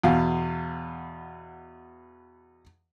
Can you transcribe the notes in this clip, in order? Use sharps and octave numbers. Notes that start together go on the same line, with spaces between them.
E2 B2 F5